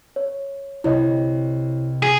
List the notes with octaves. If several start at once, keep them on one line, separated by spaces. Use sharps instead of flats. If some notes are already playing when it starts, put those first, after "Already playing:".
C#5
C2 C3 E4 C#5 D#5
G#4